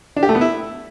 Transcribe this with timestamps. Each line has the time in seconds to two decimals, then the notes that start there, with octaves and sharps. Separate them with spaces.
0.16 D4
0.23 G4
0.29 A3
0.35 B3
0.41 E4